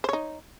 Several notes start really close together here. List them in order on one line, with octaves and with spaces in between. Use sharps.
C5 C#5 D#4